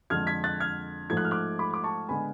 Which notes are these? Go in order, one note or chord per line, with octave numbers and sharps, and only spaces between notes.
F2 D3 G#3 F6 G#6
G#6 B6
F#6 A6
F6 G#6
G#2 F3 A3 G#6
F#6
F6
D6 F#6
B5 D6
D6
A5 C#6
D3 G#3 B3 G#5 B5